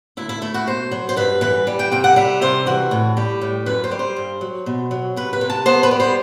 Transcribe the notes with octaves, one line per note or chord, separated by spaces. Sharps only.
D2 E4
E4
A3 E4
F#4
B2 C5
F#3
C5
G2 B4
E3 B4
G3
G5
C3 G5
F#5
G3 E5
C3 C5
E3 F#4
A2
G3 G4
A2
F#2 B4
C5
G3
C5
G2
F#3
B2
F#3
C3 B4
B4
C3
A5
B3 C5
B4
G3
C5